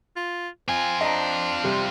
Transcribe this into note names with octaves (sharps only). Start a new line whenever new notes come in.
F4
C4 F4 G#5
D4 D#5 A#5
C3 G3